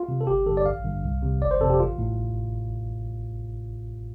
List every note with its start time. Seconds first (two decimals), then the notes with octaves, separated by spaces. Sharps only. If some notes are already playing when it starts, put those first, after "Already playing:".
Already playing: F4
0.08 C3
0.21 A4
0.27 G1 G4
0.46 G2 D3 A4
0.57 D5
0.66 A1 F5
0.84 G2 D3
1.03 C2
1.23 C3
1.41 G1 D5
1.51 C5
1.60 F2 C3 A4
1.70 G4
1.80 A1 F4
1.98 A2